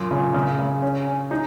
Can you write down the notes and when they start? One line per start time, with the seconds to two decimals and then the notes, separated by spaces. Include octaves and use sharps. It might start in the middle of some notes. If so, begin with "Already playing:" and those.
Already playing: F#2 A#2
0.11 C#3
0.34 C#3
0.59 C#3
0.82 C#4
1.07 C#4
1.31 D#4